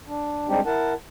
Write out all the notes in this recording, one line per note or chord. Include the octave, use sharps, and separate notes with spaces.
D4
G3 G#3 C4 D4 D#4 G4
E4 A#4 F#5 A5